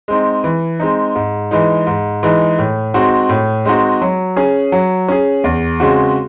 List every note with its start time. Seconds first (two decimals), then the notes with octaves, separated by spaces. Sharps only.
0.08 G#3 C4 D#4
0.44 E3
0.80 G#3 C4 D#4
1.15 G#2
1.51 E3 G#3 D#4
1.87 G#2
2.23 E3 G#3 D#4
2.59 A2
2.94 G#3 C4 D#4 F#4
3.29 A2
3.65 G#3 C4 D#4 F#4
4.02 F#3
4.36 C#4 G#4
4.72 F#3
5.08 C#4 G#4
5.44 E2
5.80 C#3 G#3 C4 F#4